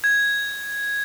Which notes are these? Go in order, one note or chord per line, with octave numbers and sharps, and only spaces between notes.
G#6